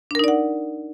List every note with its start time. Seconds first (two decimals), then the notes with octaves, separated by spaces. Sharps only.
0.11 D4
0.15 A#4
0.19 D#4
0.24 D5
0.28 F#5